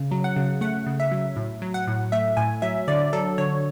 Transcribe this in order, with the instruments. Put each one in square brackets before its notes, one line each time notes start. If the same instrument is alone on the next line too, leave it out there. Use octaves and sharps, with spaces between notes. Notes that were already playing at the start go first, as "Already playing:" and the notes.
Already playing: [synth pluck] C#3
F#3
F#5
C#3
A3 F#5
C#3
E5
F#3
A2
F#3
F#5
A2
A3 E5
A2 G#5
F#3 E5
D3 D5
F#3 A4
D3 C#5